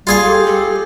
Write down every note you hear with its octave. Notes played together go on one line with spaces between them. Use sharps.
G3 F4 G#4 F5
G4 A4
A4